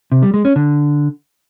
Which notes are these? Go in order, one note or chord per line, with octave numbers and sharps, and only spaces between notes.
C3
G3
G#3
C#4
D3